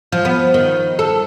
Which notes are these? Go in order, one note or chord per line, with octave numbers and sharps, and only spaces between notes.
F3
B3
D#3
A4